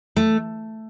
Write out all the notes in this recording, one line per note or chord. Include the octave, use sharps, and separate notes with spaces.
A3